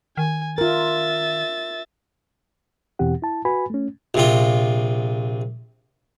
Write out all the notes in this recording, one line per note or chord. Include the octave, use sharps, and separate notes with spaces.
D#3 G#5
F4 A#4 E5 A6
E2 B2 E3 C4 G4 F#5
E4 A5
F#4 B4 G#5 B5
A3 C#4
A#1 C3 F4